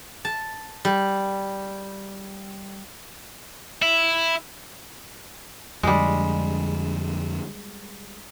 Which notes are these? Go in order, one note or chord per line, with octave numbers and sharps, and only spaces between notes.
A5
G3
E4
F2 D3 G3 G#3